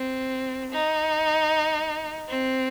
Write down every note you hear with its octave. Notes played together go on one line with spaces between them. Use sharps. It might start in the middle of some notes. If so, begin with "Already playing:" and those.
Already playing: C4
D#4
C4